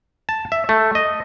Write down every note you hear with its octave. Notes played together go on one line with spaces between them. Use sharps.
A5
E5
A3
D#5